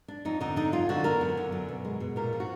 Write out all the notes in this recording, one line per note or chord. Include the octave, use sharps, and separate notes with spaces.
D4
F2 D#4
D3 D#4
D4 D#4
F#2 F4
D3 F#4
B3 A#4
F#2
D3
F#2
B2
G#3
B2
A#2 A#4
F3
F#4